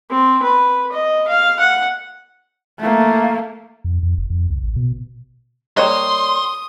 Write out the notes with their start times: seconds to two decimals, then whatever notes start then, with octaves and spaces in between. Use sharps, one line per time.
0.10 C4
0.43 B4
0.92 D#5
1.28 F5
1.60 F#5
2.80 A3 A#3
3.84 F2
4.03 F2
4.18 F1
4.30 F2
4.50 C#2
4.64 A1
4.76 B2
5.77 G3 A#3 C#5 D#5 C6 D#6